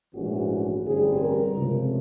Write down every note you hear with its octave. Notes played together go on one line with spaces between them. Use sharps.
A#1 G#2 E3 A3 C#4 F#4
A1 G2 D3 G3 C4 G#4
A#4
C#2 C3 F3 A3